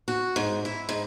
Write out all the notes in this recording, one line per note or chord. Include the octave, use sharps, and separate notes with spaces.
F#4
G#2
E4
G#2